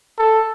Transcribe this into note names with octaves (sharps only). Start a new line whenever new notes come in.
A4